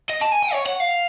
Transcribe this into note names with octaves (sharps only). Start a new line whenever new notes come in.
D#5
A5
G#5
G5
C#5
F#5
F5